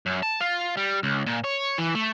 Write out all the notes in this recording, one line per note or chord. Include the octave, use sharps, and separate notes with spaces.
F#2
A5
F4
G3
C#2
A#2
C#5
E3
A3